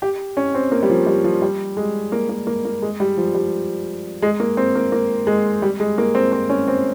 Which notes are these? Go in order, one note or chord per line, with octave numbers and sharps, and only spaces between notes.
G4
C#4
C4
A#3
G3
F3
G3
F3
G3
G#3
A#3
A#3
A#3
A#3
G#3
G3
F3
G3
G#3
A#3
C4
A#3
A#3
G#3
G3
G#3
A#3
C4
C4
C#4
C4